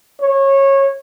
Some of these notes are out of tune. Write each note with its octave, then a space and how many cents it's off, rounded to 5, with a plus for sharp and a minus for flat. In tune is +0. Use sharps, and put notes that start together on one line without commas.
C#5 -20